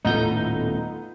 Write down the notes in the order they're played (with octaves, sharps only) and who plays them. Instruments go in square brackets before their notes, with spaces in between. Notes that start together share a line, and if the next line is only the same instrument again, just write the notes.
[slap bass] D#1 A2 A3 [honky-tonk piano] B3 F4 A4 [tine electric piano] D#4 G6